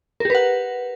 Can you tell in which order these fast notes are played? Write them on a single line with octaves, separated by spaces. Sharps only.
A#4 G4 B4 F#5